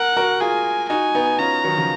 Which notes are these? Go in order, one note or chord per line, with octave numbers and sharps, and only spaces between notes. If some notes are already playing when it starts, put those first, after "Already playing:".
Already playing: A#4 F#5
F#4 A#4
F4 G#4 G#5
D#4 F#4 G#5
B3 D#4
C#4 F4 A#5
D#3 F#3
C#3 F3